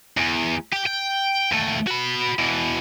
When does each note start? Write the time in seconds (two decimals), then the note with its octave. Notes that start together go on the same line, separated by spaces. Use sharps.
0.17 E2
0.73 G4
0.87 G5
1.52 D#2 A3
1.87 F#4 B5
2.39 B2 E3